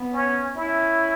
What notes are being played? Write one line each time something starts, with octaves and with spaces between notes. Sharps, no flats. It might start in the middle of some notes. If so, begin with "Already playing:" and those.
Already playing: B3
C#4
C#4 E4